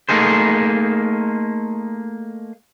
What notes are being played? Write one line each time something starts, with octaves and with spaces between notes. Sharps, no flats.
A3 A#3 D#4 G#4 C5